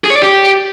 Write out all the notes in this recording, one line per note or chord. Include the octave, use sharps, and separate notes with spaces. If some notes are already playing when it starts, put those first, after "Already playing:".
G#4
C#5
D5
G4